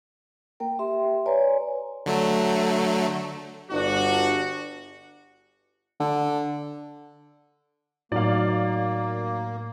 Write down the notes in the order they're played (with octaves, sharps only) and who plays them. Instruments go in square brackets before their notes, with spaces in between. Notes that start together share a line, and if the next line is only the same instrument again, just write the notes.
[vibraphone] A#3 A#4 G5
G4 E5 C6
B4 C#5 D5 G#5 A#5
[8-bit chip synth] D3 F#3 A3
[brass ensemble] G1 D4 F#4
[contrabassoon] D3
[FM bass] A2 [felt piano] F#3 D#4 [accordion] A#3 [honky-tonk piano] D5 F5